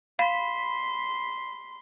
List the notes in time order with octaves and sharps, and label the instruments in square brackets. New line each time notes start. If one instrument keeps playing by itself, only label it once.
[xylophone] F5 [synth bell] B5 B6 [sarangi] C6